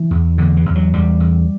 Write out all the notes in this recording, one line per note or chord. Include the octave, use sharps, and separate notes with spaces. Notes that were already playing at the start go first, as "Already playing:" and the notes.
Already playing: E3
E2
E2 D3
E3
E2
F#3
E2 G3
E2